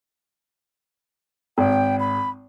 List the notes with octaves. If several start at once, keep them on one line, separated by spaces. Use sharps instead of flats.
G#1 G5
B5